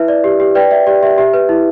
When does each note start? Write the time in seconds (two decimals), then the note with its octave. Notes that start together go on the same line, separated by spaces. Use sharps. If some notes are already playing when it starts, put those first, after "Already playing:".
Already playing: E4 B4 E5
0.08 D5
0.24 G4
0.40 G4
0.55 B4 D5 G5
0.71 D5 E5
0.87 G4 D5
1.02 G4 E5
1.18 G4 E5
1.34 B4
1.49 E4